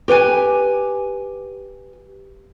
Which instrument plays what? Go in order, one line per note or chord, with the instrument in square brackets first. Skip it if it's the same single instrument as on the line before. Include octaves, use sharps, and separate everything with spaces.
[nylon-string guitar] G4 B4 G5 G#5